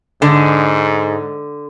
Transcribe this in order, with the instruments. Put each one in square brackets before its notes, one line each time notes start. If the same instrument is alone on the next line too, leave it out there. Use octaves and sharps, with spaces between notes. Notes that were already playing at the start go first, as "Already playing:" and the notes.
[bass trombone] G#2 [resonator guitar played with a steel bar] D3